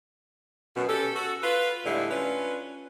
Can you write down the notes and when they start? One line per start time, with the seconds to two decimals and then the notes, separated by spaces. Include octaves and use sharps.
0.75 F#2 B2
0.89 C#4 G4 A4
1.15 F#4 A4
1.42 F4 B4
1.85 A2 D3 G3 G#3 E4
2.09 C#4 D4 F4 B4